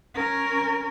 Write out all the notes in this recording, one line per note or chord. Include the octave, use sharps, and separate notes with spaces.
C#4 A#4